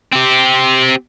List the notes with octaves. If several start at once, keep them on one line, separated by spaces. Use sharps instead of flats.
C4 G4